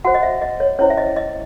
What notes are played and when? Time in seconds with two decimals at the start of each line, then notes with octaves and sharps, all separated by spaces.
0.05 F#4 C5 F#5
0.14 D#5
0.23 E5
0.42 D#5
0.60 C#5
0.79 C#4 E4 C5 C#5
0.90 E5
0.98 D#5
1.16 D#5